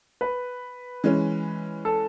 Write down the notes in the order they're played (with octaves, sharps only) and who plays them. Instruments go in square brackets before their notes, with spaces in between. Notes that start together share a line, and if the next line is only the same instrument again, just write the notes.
[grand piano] B4
[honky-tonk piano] E3 G#3 C#4
[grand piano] A4